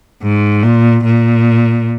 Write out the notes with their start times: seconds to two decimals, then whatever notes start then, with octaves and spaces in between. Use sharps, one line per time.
0.23 G#2
0.63 A#2
1.04 A#2